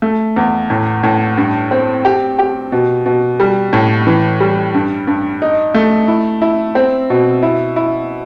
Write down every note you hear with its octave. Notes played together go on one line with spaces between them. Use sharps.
A3
E2
A2
A2
G2
C4
G4
G4
B2
B2
G3
A2
E3
G3
G2
G2
D#4
A3
E4
E4
C4
B2
E4
E4